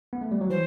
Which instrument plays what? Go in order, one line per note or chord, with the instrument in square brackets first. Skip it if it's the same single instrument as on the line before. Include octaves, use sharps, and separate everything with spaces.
[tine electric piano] B3
A3
G3
F#3
[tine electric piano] E3 [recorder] C5